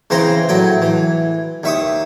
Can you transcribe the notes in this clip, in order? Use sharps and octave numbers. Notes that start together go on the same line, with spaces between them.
C#3 E3 C4 A#5 C6
A2 F#3 G5
E3
D#2 E5 C#6 D#6